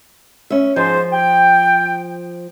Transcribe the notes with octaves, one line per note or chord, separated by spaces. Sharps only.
C#4 E5
G#2 F3 C5
G5